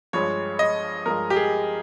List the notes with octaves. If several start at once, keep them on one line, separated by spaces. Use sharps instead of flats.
G2 F3 G#3 C#5
D#5
G2 F3 G#3 A#4
G4
G#4